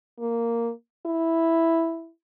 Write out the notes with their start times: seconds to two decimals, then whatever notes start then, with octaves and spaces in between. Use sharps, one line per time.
0.19 A#3
1.06 E4